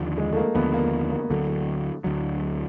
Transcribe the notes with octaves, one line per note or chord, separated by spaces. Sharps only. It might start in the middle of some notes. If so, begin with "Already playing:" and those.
Already playing: D#2 D3 F3
G#3
A3
A#3
D#2 D3 F3 B3
A#3
A#3
D2 D3 F#3 A3
D2 D3 F#3